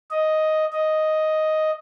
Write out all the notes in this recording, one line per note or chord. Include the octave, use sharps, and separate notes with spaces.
D#5
D#5